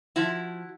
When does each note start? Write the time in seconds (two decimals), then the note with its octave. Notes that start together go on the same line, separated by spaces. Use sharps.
0.16 F3 E4 F#4